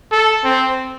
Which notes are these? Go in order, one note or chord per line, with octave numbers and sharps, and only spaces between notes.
A4
C4